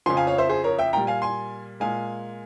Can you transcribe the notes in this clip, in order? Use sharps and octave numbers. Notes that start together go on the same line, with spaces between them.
F2 C#3 F3 G#5 C6
F5 G#5
C#5 F5
C5 E5
G#4 C5
A#4 C#5
E5 G5
A#2 G3 G5 A#5
F5 G#5
G#5 C6
A#2 G#3 F5 G#5